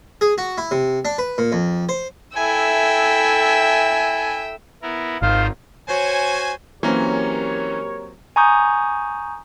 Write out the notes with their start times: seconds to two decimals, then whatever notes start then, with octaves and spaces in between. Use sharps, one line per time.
0.21 G#4
0.38 F#4
0.58 E4
0.71 C3
1.05 D4
1.18 B4
1.38 A#2
1.52 F2
1.89 C5
2.36 E4 A4 E5 G5 G#5 E6
4.82 B3 E4 A#4
5.22 G#1 D#3 F4 C5 F5
5.88 F#4 C5 C#5 G#5
6.83 E3 F#3 A#3 C4 C#4 G4 A#4 C#5
8.36 G#5 A#5 C#6 D#6 G6